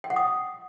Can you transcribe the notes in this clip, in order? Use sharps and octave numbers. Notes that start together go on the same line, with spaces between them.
G5
F#5
D#6